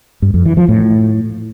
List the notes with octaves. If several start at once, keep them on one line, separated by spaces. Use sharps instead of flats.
G2
F2
E3
F3
A2